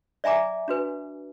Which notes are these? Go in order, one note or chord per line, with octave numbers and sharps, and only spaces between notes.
D5 E5 G#5 A#5 D6
D4 F#4 B4